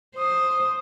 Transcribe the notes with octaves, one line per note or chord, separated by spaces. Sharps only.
C5 D#6